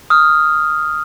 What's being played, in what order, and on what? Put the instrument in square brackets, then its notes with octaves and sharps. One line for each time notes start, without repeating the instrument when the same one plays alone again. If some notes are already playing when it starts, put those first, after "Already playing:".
[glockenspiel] D#6 F6